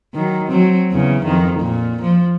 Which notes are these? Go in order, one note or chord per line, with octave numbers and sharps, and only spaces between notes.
D#3 F#3
F#3 C4
E2 C#3
F2 D#3
A#2
F3